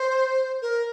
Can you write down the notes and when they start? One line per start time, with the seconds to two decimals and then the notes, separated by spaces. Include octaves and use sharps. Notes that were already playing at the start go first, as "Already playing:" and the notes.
Already playing: C5
0.62 A#4